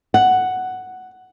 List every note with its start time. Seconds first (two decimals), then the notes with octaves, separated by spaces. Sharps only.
0.14 F#5